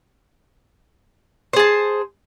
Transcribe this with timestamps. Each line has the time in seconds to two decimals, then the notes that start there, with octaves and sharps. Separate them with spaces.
1.53 C5
1.56 G#4
1.59 A5